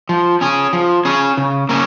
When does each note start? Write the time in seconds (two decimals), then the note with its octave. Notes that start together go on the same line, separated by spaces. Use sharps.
0.09 F3
0.41 C#4 G#4
0.73 F3
1.05 C#4 G#4
1.37 C#3
1.69 A#3 C#4